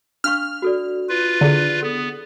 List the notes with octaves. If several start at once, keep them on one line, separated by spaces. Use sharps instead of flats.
D4 F5 C#6 F6
F#4 A4 D5
F4 B4
D3 E4 G#4 D5
B3 A4